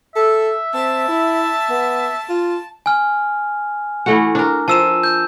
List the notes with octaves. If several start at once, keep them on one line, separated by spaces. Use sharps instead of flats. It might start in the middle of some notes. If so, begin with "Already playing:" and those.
A4 E5
C4 A5
E4
B3
F4
G#5 F6
E3 A3 F#4
D4 A#4
F3 A5 E6 E7
G6